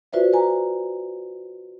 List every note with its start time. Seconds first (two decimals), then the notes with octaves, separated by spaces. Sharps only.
0.13 F4 F#4 B4 C5 D5 E5
0.33 B4 G#5 A#5